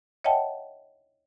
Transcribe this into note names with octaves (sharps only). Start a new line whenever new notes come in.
C#5 D#5 E5 F#5 G5 A5